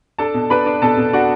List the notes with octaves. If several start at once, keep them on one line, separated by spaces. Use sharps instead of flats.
D4 A4 A5
B2
D4 B4 B5
D4
B2 A4 A5
B2
D4 F#4 F#5